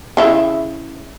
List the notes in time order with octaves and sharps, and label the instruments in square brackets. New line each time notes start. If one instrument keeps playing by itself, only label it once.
[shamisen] C#3 E4 E5